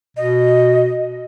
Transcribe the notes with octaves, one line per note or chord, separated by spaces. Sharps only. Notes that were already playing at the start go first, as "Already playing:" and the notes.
B2 D#5